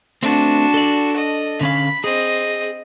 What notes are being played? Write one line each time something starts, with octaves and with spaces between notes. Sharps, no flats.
A3 C4 D4 F#4
A4 D5
D#5
D3 C#4 F5 B5
C4 G#4 D#5